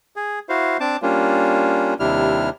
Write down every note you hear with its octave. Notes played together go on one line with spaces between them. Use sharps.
G#4
E4 F#4 C5 F5
C4 D4 A5 D6
G3 A#3 C#4 D4 F4
D#2 C3 G3 D4 E4 F6